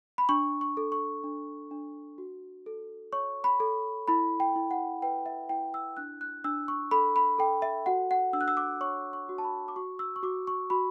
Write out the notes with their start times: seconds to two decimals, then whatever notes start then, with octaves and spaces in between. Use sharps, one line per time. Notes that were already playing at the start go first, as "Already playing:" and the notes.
0.18 B5
0.29 D4 C#6
0.61 C#6
0.77 A4
0.92 C#6
1.24 D4
1.71 D4
2.18 F#4
2.66 A4
3.13 C#5 C#6
3.44 B5
3.60 A4
4.08 E4 B5
4.40 G5
4.56 E4
4.71 F#5
5.02 B4 G5
5.26 E5
5.49 E4 G5
5.74 E6
5.97 D4 F#6
6.21 F#6
6.44 D4 E6
6.68 C#6
6.91 A4 B5
7.16 B5
7.39 A4 G5
7.62 E5
7.86 F#4 F#5
8.11 F#5
8.33 D4 E6
8.41 F#6
8.48 E6
8.57 D6
8.81 C#5 C#6
9.13 C#6
9.29 F#4
9.38 A5
9.44 B5
9.68 D6
9.76 F#4 C#6
9.99 E6
10.16 C#6
10.23 F#4 D6
10.47 C#6
10.70 F#4 B5